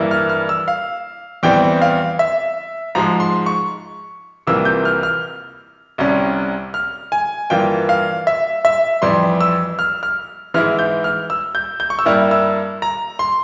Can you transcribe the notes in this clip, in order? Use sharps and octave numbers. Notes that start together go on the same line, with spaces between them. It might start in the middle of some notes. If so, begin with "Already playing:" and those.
Already playing: G2 E3 A#3 E4
F6
F6
E6
F5
E2 E3 G3 C4 G5
F5
E5
G#2 F3 G#3 A#5
C6
C#6
C2 C3 E3 A#3 F4 E6
G6
F6
F6
C2 C3 G3 C#4
F6
G#5
G2 E3 A#3 F4 G5
F5
E5
E5
F2 E3 G3 C6
E6
F6
F6
G#2 E3 G#3 E4 F6
G6
F6
E6
G6
G6
C#6
E6
G2 G3 A#3 E4 F6
E6
A#5
C6